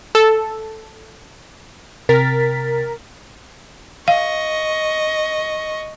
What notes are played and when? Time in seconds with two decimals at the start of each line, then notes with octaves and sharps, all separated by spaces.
0.15 A4
2.09 C3 A#4 A6 B6
4.08 D#5 F5 C#6